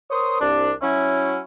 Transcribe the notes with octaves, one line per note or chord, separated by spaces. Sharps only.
A#4 C5 C#5 C6 D#6
C2 D4
F#3 C#4 E4